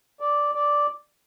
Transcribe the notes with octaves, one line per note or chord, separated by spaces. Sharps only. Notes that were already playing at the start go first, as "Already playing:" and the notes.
D5
D5